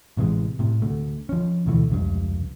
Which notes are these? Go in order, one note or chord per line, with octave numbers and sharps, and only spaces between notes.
A1 C3 E3 G#3
A2 C3
D2 A3
F3 C#4
D2 B2 E3 A3
F1 C#2 G2